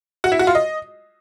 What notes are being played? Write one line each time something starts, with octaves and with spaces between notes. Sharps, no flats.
F#4
E4
F#4
F4
D#5